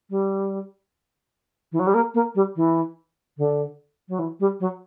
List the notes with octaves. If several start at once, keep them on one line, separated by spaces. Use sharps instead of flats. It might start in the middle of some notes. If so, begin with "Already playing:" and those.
G3
E3
F#3
G3
A#3
A#3
G3
E3
D3
F#3
E3
G3
F#3